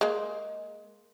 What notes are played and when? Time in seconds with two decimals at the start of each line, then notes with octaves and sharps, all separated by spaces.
0.01 G#3 A#3